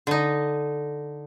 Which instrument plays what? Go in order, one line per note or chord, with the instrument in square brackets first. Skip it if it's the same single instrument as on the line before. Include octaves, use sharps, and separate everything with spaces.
[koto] D3 D#4